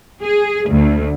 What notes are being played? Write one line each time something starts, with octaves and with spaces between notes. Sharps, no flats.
G#4
D2